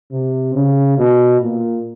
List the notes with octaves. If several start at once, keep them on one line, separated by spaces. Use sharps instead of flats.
C3
C#3
B2
A#2